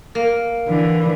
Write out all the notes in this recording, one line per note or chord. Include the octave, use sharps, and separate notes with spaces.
A#3
D3 E3